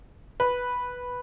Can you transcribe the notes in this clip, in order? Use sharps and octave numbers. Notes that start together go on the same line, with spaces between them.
B4